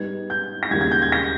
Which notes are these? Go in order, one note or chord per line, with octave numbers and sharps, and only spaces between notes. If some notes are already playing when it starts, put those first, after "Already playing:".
Already playing: G#2 G3 B3 D#4 G#6
G6
A#6
E1 D#2 C#3 G3 G#6
G#6
G6
G#6
A#6